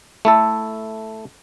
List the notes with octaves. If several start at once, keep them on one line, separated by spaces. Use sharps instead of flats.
A3 E4 A4